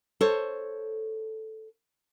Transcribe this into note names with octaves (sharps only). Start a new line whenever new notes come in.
A4 C5 C#5